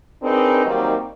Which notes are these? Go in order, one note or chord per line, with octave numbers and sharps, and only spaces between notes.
C4 D4 D#4 G#4 A#4 B4
D#3 F#3 G3 A#3 C4 D#4